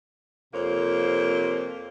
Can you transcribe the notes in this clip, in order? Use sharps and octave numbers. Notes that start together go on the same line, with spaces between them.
F2 C3 A#3 C5 C#5